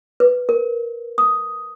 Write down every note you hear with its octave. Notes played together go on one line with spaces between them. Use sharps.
B4
A#4
D#6